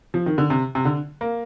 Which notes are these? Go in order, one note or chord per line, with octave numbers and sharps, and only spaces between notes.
F3
D#3
D3
C3
C3
D3
A#3